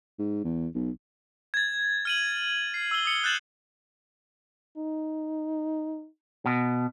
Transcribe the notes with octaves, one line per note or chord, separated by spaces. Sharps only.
G#2
E2
B1
G#6 A6
F6 D#7 F#7
C7
E6 G7
D#6 C#7 G7
F#6 G6 A6 E7 F#7
D#4
B2